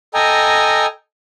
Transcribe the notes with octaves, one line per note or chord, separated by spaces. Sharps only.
A4 D#5 G5 G#5 A#5